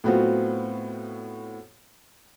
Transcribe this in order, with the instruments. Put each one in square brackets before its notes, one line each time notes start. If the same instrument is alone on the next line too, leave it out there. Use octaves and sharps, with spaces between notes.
[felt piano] A2 F#3 B3 C4 F4 F#4